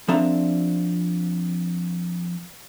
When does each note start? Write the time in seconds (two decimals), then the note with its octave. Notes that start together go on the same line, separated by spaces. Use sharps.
0.08 F3 C4 D4 A4 E5 A#5